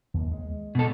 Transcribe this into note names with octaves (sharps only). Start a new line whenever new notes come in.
D#2
G#3
B2 A4